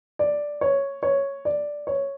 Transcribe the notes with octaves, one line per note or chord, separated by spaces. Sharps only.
D5
C#5
C#5
D5
C#5